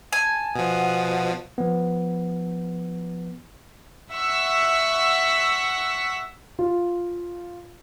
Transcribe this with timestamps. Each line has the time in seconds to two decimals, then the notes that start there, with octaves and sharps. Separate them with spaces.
0.13 G#5 A5
0.56 B2 F3 F#5 D#6
1.58 F3 B3
4.11 E5 F#5 C#6 E6 B6
6.59 F4